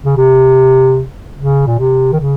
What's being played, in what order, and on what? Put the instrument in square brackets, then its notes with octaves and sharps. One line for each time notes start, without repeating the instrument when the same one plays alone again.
[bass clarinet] C#3
C3
C#3
A#2
C3
D#3
C#3